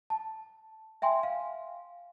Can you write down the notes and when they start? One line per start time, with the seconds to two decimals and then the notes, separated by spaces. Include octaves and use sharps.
0.10 A5
1.02 E5 G5 G#5 C6
1.23 F5